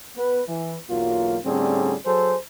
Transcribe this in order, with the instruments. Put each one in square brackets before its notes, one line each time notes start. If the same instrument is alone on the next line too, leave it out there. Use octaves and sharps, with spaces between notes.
[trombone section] B3 B4
E3
B1 E2 F#3 A#3 F4
A2 D3 G3 C4 C#4 G#4
F#3 G#4 A4 C5